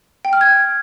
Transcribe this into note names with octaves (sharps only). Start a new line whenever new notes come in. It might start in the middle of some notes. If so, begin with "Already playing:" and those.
G5
F6
G#6